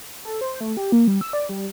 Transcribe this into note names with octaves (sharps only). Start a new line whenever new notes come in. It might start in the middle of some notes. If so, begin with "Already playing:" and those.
A4
C5
A3
G4
A#3
G3
E6
D5
G3